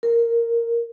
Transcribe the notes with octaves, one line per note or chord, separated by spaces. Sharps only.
A#4